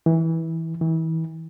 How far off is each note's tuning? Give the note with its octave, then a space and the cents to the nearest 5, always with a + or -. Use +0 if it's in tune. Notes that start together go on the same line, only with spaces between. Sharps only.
E3 -20
E3 -35